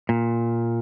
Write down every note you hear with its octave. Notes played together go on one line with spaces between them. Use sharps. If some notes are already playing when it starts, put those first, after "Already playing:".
A#2